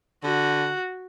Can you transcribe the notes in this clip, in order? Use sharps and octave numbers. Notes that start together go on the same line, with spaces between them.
D3 F#4